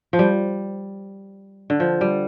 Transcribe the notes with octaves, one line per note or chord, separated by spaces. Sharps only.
F3
G3
D3
F3
G3